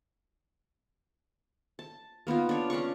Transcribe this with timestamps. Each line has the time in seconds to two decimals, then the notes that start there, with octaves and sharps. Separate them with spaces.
1.79 A5
2.27 A#3 B3 D#4 F4
2.49 D4 C#5
2.70 C#4 D4 F5 C#6